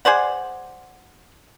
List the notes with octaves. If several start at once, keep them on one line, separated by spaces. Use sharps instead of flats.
G#4 C5 D5 F#5